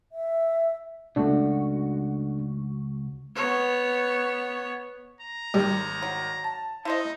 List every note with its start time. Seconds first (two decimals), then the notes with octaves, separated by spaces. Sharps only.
0.12 E5
1.16 C#2 A3 D4 F#4
3.36 B3 C#5
5.21 A#5
5.54 G#1 D#3 G3
6.02 F#3
6.44 A5
6.85 D#4 E4 C5 D#5